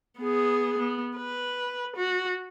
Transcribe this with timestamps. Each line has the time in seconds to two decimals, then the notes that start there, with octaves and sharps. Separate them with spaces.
0.19 B3 G#4
0.78 B3
1.17 B4
1.96 F#4